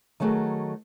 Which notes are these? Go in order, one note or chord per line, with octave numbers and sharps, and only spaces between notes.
D#3 F#3 A3 F#4 G#4